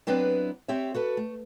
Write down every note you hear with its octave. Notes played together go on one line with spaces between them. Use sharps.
F#3 B3 C4 D4 E4 B4
C4 G4 C#5 E5
F#4 A4 B4
A3